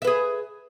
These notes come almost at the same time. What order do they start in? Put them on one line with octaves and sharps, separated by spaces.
E5 B4 G#4